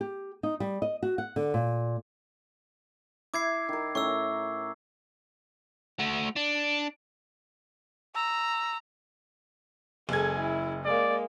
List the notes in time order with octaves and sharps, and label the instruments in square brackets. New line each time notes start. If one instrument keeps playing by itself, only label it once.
[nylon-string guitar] G4
D#4
G3
D#5
F#4
F#5
D3
A#2
[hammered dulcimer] E4 [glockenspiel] D6 G#6 C7
[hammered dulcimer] D#3 A#4
[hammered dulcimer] A2 C#4 A#4 [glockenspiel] C#6 E6
[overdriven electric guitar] A3 F#4
D4
[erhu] A#5 [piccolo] E6
[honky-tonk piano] F#1 G#3 G#6 [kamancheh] A4 G#5
[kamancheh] E4
[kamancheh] G#3 A#3 [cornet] D5